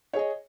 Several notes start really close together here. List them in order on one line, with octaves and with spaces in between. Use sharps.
C#5 G#4 D#5